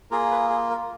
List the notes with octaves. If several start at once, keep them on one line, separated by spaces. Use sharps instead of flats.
A#3 F4 G#4 A#4
B4
G#4
A#4